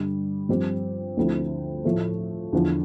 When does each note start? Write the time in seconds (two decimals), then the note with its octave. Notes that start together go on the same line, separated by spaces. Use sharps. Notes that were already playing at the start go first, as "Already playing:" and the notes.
Already playing: G2 D3 G3
0.49 G2 F3 C4 G4
1.17 D2 D3 F3 C4 E4
1.85 A2 F3 A3
2.53 E2 D3 F3